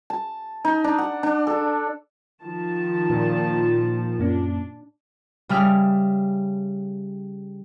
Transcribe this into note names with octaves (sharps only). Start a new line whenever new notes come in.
A5
D#4
D4
F#5
D4
A4
D#3 F3 A5
A#2
F#2 A#3 C#4 D4
C#3 G3 E5 F6